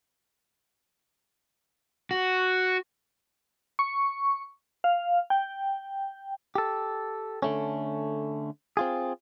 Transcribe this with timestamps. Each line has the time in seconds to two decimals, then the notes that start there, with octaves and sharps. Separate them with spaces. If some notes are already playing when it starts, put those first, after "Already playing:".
2.11 F#4
3.79 C#6
4.84 F5
5.30 G5
6.55 G4 A4
7.42 D3 A3 C#4
8.77 C4 F4 G#4